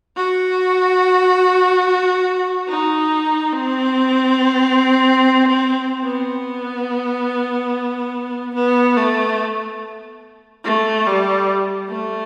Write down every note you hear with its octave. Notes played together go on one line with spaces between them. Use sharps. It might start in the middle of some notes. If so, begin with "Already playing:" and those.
F#4
D#4
C4
B3
B3
A3
A3
G3
A3